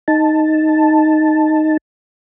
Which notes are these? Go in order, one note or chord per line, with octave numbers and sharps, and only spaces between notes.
D#4 A5